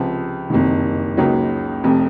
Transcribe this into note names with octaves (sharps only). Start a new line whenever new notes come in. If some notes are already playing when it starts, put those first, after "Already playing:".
Already playing: C#2 C3 F3
F#1 F2 C3 D#3
C#2 C#3 F#3 A#3 D#4
F1 F2 C3